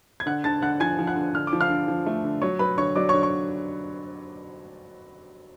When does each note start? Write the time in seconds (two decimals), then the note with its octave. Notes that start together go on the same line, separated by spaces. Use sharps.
0.20 G#6
0.26 D3 F#5 F#6
0.44 D3 A5 A6
0.62 D3 F#5 F#6
0.80 F3 G#5 G#6
0.99 F3
1.07 F#5 F#6
1.16 D3
1.34 D3 F6
1.47 D6
1.53 F3
1.61 F5 F6
1.70 D3
1.88 F3
2.06 A3
2.24 D3
2.42 F#3 C#5 C#6
2.59 F#3 B4 B5
2.77 D3 C#5 C#6
2.96 F#3 D5 D6
3.09 C#5 C#6
3.14 D3
3.23 C#5 C#6